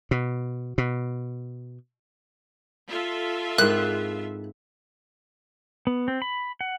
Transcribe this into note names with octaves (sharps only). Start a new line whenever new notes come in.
B2
B2
F4 A4 E5
G#2 C4 E4 A#4 F#6
B3
C4
B5
F#5